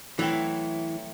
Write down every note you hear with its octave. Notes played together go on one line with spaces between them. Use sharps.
A2 E3 F#3 C4 E4